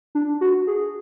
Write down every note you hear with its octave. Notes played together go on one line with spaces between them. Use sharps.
D4
F#4
G#4